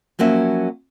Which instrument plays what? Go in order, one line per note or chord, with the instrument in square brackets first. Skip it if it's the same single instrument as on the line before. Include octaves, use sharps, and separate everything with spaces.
[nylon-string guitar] F3 F#3 A#3 C#4 E5